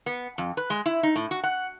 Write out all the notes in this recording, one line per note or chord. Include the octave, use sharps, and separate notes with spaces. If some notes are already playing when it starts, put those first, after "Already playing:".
B3
F2
B4
G#3
E4
D#4
A2
F#4
F#5